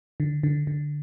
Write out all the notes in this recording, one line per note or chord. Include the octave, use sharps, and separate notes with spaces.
D3
D3
D3